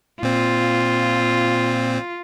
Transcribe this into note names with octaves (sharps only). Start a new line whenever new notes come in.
A#2 C4 F4